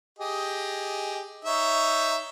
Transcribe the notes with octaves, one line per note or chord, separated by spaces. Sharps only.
G4 G#4 D#5
D#4 C#5 E5